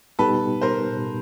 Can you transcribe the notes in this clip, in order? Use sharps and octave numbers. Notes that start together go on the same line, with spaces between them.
G3 B3 D#4 G4 A4 B4
A#4 C5